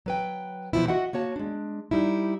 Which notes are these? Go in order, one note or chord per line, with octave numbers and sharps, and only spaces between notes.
F#3 B4 G5
B2 E3 F3 B3 E4
F#4 D#5 E5 F#5
A#3 F#4 C#5 A5
G#3 D4
G3 D#4 E4